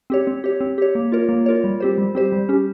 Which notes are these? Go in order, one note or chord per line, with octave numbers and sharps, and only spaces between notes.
C4 G4 C#5
C4
G4 C#5
C4
G4 C#5
A#3
F4 A#4 C#5
A#3
F4 A#4 C#5
G3
C4 G4 C5
G3
C4 G4 C5
G3
C#4 G4